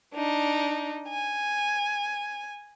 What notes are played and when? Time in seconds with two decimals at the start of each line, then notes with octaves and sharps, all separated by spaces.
0.14 D4 D#4
1.10 G#5